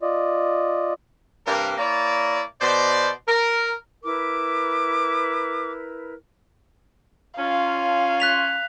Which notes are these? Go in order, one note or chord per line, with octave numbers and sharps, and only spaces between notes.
F4 D5 D#5
G2 C3 G3 A#3 G4 A#4
A#3 E4 C#5 D5
B2 C5 D5
A#4
E4 A#4 B4 D6
C#4 F4 F5
F#6 B6 F7